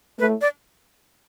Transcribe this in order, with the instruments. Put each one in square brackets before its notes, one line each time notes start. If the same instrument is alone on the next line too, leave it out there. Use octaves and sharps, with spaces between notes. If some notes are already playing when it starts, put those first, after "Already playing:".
[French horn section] A2 A3 [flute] B4
[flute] D5